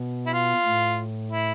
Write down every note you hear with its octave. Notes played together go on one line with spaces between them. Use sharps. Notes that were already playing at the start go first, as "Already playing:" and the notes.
Already playing: B2
E4
F4
A2
E4